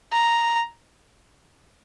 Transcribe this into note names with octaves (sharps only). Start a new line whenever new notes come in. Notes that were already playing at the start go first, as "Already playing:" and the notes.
A#5